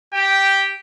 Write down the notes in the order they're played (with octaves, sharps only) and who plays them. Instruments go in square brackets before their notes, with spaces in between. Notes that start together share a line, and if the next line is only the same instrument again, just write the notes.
[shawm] G4 [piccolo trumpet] G5